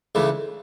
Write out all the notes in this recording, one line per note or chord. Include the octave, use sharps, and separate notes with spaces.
C#2 C#3 E3 A3 D4